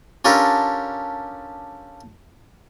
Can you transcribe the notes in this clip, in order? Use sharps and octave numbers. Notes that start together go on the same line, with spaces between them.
C#4 D4 F4 G4 A4 A#4